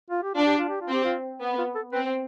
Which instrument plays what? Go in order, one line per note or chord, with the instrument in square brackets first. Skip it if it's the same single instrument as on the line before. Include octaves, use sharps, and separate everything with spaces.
[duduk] F4
G4
[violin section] D4 [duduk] F4
[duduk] G4
F4
G4
F4
[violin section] C4 [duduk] G4
[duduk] F4
[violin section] B3
[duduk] F4
A4
[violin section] C4 [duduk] B4